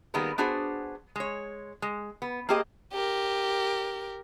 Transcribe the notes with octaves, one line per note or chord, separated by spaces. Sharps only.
D#3 G3 A#3 B3 G#4 A#4
B3 D4 F#4 G#4 C5
G#3 C#5
G#3
B3
A#3 C4 G4 G#4 D#5
G4 A#4